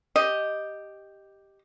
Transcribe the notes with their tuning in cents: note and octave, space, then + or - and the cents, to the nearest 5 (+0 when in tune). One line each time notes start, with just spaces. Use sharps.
G4 +0 D#5 +0